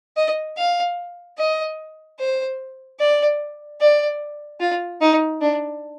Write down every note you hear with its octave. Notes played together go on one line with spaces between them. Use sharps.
D#5
F5
D#5
C5
D5
D5
F4
D#4
D4